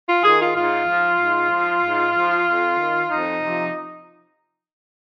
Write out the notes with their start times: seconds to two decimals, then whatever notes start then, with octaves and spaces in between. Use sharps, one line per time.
0.08 F4
0.24 D#3 G#4
0.41 F4
0.56 G#2 F4
0.88 F3
1.20 G#2
1.51 F3
1.83 G#2
2.15 F3
2.47 F2
2.78 D#3
3.09 F2 D#4
3.41 C3 F3